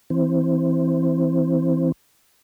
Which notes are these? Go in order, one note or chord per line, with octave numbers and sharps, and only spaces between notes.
E3 C4